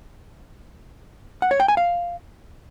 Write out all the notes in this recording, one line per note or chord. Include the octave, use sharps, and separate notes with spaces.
F#5
C#5
G5
G#5
F5